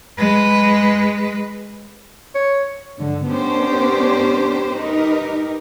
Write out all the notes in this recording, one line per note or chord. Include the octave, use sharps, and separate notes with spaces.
G#3 B4
C#5
G2 D3 G#3
B3 C#4 D4 G4 A#4 C5
D#4 G4 A#4 B4